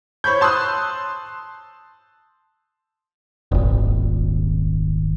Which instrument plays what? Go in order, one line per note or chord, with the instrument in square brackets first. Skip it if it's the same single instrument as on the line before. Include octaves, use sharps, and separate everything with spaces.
[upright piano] C5 C#5 B5 C#6 G6
A5 C6 D#6 E6 F#6
[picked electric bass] D#1 G#1